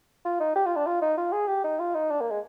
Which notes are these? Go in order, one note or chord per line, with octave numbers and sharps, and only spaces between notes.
F4
D#4
G4
F4
D4
F4
D#4
F4
G#4
G4
D#4
F4
D#4
D4
A#3
G#3